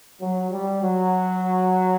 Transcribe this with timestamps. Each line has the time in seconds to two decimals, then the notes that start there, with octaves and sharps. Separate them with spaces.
0.21 F#3
0.52 G3
0.82 F#3